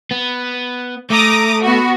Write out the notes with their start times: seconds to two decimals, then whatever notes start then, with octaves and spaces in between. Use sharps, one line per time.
0.11 B3
1.10 A3 A#5 D6 D#6
1.63 B3 F#4